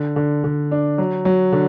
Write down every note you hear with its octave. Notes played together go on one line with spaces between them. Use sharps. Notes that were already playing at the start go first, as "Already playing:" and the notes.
Already playing: D3
D3
D3
D4
F#3
F#3
D3